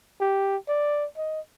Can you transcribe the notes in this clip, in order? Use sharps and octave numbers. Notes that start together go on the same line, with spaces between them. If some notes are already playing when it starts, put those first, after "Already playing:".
G4
D5
D#5